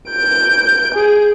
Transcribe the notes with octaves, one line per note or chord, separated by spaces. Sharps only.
G6 D7
G#4